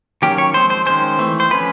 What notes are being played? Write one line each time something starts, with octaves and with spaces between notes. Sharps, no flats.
D#3 F#3 A#3 C#4 G4
C#5
F3 G#3 C4 C5
C5
D#3 G#3 C#4 C5
E3 A3 C4
C5
F3 A3 C#4 B4